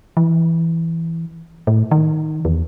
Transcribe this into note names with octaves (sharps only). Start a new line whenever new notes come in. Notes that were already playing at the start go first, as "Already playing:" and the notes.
E3
A2
D#3
E2